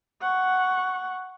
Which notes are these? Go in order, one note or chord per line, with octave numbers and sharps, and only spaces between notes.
F#5 C#6